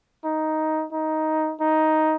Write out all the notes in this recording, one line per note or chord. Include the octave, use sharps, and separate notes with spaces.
D#4
D#4
D#4